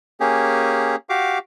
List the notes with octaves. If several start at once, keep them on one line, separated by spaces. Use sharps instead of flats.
A#3 C#4 G4 G#4
F#4 G4 F5 D6